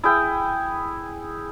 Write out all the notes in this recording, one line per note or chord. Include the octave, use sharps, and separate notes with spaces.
E4 G#4 G5